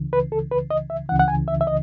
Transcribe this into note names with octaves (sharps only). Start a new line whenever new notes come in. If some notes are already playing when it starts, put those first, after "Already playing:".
Already playing: C#2 C#3 E3
B4
A4
B4
D#5
E5
C#2 C#3 E3 F#5
F#5
G#5
E5
E5
D#5